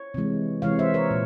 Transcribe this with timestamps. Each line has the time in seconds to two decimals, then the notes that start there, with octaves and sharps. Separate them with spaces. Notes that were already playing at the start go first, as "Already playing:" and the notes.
Already playing: C#5
0.14 C3 E3 G#3
0.62 C3 E3 G#3 C#5 F5
0.79 C5 E5
0.94 A#4 C#5
1.11 A#2